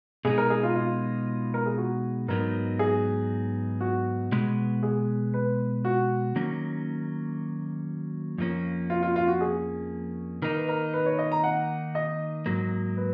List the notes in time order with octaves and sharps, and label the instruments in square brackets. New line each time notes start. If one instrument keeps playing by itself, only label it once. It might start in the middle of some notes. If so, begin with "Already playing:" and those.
[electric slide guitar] B2 G#3 D#4 [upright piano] G#4
[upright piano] A#4
G#4
F4
F4
A#4
G#4
F#4
[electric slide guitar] G#2 F#3 B3 D#4 [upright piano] A#4
[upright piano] G#4
F#4
[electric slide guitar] B2 G#3 B3
[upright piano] G#4
B4
F#4
[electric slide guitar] D#3 F#3 A#3 C#4
F2 F3 A#3 C#4
[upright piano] F4
F4
F4
F#4
G#4
[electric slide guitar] D#3 A#3 D#4 [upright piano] A#4
[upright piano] B4
A#4
B4
C#5
D#5
A#5
F#5
D#5
[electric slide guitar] G#2 F#3 A#3
[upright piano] B4